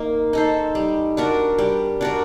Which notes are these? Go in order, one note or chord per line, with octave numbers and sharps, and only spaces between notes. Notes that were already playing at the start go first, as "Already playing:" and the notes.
Already playing: A#3 D#4
D#4 A4 C5
G3
D4 F#4 A#4
G3
D4 F#4 A#4